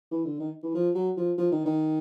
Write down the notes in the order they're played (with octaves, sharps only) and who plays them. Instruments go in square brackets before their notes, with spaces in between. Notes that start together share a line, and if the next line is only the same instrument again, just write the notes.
[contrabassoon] E3
D3
D#3
E3
F3
F#3
F3
F3
D#3
D#3